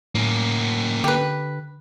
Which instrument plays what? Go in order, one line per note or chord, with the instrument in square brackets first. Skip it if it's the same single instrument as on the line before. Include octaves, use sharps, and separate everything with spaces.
[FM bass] A2 [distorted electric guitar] A#3 C#4
[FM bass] D3 [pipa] G4 B4